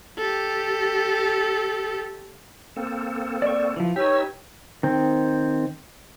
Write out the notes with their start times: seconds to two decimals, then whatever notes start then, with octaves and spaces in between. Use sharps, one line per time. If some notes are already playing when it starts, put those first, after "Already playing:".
0.18 G4 A4
2.76 A#3 C4 A4
3.42 D5 C#6
3.76 E3 F3
3.96 D#4 G4 B4 C#5 E6
4.83 D#3 C4